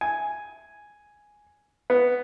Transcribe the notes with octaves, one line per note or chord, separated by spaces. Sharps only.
G#5
B3